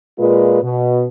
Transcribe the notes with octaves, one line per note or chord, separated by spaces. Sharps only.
A#2 G#3 F4 B4
B2